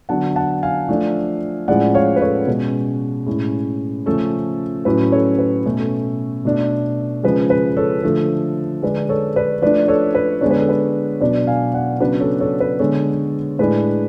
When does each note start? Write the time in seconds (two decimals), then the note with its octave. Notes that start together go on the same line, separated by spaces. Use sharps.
0.09 D3 F#3 B3 D4 F#5 A5
0.36 F#5 A5
0.63 F5 G#5
0.89 F3 A3 D4
1.68 A2 F3 G#3 C#4 D5 F#5
1.94 C#5 F5
2.16 B4
2.22 A4 C#5
2.47 B2 G#3 C#4
3.27 A2 G#3 C#4
4.06 C#3 F3 A3 C#4 A4
4.85 A2 F#3 C#4 B4
5.12 A4 C#5
5.39 B4
5.65 B2 A3 C#4 A4
5.79 A4
6.45 B2 A3 D4
7.23 C#3 F3 G#3 B4
7.50 B4
7.77 A4 C#5
8.03 D3 F3 A3 A4
8.82 D3 G#3 D4 B4
9.09 A4 C#5
9.36 B4 D5
9.62 F3 A3 D4 B4 D5
9.88 A4 C#5
10.15 B4
10.41 D3 G#3 B3 D4 C#5
10.51 B4
10.61 A4
10.69 B4
11.21 B2 F#3 B3 D4 B4 D5
11.47 F5 G#5
11.74 D5 F#5
12.00 C#3 F#3 B3 D4 B4 D5
12.20 A4 C#5
12.40 A4 C#5
12.60 B4
12.79 D3 G#3 B3 A4 C#5
13.59 A2 G#3 D4 B4